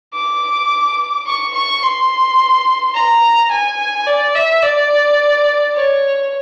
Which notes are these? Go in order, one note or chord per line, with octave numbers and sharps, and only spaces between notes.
D6
C#6
C#6
C6
A#5
G#5
D5
E5
D5
C#5